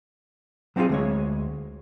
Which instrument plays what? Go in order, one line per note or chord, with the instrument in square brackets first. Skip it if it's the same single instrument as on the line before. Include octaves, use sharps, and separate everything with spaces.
[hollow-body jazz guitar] F#3 C4 C#4 F4 G#4
D2 G#3 C#5